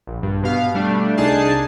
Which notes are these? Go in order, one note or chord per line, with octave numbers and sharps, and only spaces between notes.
A#1
G2
B2 B3 F5
G3 A3 D4
C2 D4 D#4 G#4 A5 C7